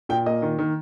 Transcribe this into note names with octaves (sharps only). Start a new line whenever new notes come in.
A#2 G5
A#3 D#5
D#3
D#3